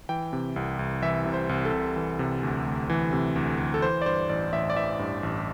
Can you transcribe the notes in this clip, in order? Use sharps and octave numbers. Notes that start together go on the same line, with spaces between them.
E3 G5
C3
C2
C2
E3 E5
C3
C5
C2
A4
C2
E3
C3
D2
D2
E3
C3
D2
D2
A4
E3 C5
D5
G2 C5
A1 D5
A1 E5
D5
E3 E5
G2
A1